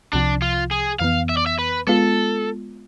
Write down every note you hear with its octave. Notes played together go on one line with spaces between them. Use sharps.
C2 C3 F3 D4
F4
G#4
F2 E3 B3 F5
E5
D5
E5
B4
G#3 B3 F4 A4